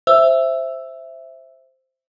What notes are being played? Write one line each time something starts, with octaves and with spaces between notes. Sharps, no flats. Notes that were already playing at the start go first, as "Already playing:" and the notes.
C5 E5 E6